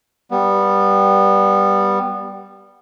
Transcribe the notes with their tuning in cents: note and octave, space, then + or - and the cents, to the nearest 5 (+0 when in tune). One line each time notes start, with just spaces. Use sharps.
G3 +0 B3 -15